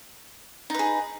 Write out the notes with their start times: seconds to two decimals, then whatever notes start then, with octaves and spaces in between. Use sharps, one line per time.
0.70 D#4
0.74 B4
0.79 G#4